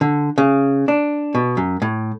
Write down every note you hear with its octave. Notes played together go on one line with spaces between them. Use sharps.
D3
C#3
D4
B2
F#2
A2